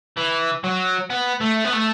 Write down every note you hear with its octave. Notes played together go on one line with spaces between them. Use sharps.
E3
F#3
B3
A3
B3
A3